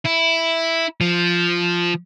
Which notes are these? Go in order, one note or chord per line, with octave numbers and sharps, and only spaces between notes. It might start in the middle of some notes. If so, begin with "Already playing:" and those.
E4
F3